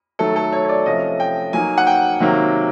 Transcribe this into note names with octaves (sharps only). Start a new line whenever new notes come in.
D#3 F#3 A3 A4
A4
C#5
C#5
D5
C3 F3 A3 C#4 D#5
G5
F#3 A#3 D#4 G#5
F#5
G5
C3 D#3 F#3 A#3